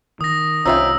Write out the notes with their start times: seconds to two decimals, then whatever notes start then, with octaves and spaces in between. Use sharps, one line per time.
0.21 D#3 D#6 A#6
0.66 C2 C#4 D#4 F4 C5 E5 G5 E6